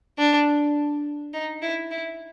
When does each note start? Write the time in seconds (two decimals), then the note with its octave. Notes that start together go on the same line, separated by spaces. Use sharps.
0.18 D4
1.33 D#4
1.62 E4
1.91 E4